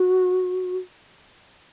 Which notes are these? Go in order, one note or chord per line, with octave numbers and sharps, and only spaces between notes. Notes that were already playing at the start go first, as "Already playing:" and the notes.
Already playing: F#4